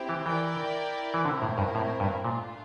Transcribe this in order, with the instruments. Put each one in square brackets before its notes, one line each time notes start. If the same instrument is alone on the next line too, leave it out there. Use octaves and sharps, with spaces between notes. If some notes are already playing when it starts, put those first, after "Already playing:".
Already playing: [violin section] C4 E4 G4
[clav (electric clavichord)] E3
[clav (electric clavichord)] E3 [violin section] E4 A#4 D5 G5
[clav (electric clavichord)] E3
[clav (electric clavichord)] D3 [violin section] C4 E4 A#4
[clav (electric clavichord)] A2
G2
A2
G2
[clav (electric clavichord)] A#2 [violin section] A3 D4 F4